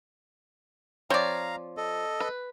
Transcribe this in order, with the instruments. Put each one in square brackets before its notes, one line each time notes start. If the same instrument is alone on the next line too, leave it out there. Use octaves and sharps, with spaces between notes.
[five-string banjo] F3 C#5 [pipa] C4 D5 [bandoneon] F5 A#5
[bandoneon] A4 D#5
[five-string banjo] B4